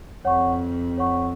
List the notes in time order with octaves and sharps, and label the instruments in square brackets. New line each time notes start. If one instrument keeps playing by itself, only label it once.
[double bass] F2 [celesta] C#5 F#5 C#6
[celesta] C#5 F#5 C#6